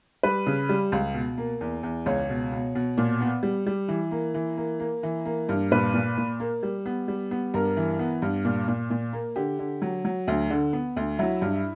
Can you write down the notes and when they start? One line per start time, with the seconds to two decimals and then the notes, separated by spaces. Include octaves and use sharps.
0.23 G3 B4
0.47 C#3
0.69 G3
0.92 C#2
1.14 B2
1.38 A#3
1.61 E2
1.83 E2
2.06 C#2 C#5
2.29 B2
2.52 B2
2.75 B2
2.98 A#2
3.21 B3
3.43 G3
3.66 G3
3.88 E3
4.11 A#3
4.34 E3
4.57 A#3
4.80 A#3
5.03 E3
5.26 A#3
5.49 G2
5.71 A#2 B4
5.94 A#2
6.17 A#2
6.40 A#3
6.63 G3
6.86 B3
7.08 G3
7.31 B3
7.54 G2 A#4
7.77 E3
7.99 B3
8.22 G2
8.45 A#2
8.68 A#2
8.90 A#2
9.13 A#3
9.36 D3 G4
9.59 D3
9.82 F#3
10.05 F#3
10.28 D2
10.50 D3
10.73 B3
10.96 D2
11.19 F#3 E4
11.42 G2